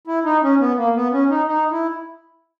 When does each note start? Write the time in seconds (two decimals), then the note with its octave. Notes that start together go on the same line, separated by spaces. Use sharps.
0.07 E4
0.25 D#4
0.43 C#4
0.60 B3
0.77 A#3
0.95 B3
1.12 C#4
1.30 D#4
1.48 D#4
1.71 E4